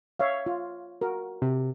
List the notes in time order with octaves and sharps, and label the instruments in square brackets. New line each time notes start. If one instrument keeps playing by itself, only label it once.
[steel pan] C#5 E5 F5
F4
F#4 A#4
[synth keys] C3